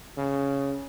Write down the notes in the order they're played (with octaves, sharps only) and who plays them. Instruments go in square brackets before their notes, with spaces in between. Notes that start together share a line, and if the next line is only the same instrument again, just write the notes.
[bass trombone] C#3